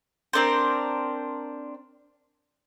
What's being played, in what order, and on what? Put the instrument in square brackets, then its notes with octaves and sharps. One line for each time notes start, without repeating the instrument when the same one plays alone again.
[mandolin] C4 D4 A#4 C5